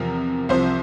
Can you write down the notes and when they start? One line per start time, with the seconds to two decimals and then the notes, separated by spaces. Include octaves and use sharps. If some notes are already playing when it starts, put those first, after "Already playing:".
Already playing: E2 C3 F3 A#4
0.49 C2 C3 F3 C5